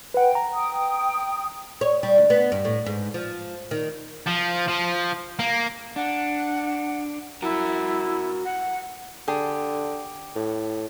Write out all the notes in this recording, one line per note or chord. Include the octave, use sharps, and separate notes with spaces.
B4 F#5 G5
A#5
G5 D#6
C#5
G3
D2
B3
G2
A2
G#2
F3
D#3
F3
F3
A#3
D4 F#5
E4 F#4 A#4
F#5
D3 G4 G#4 A5
A2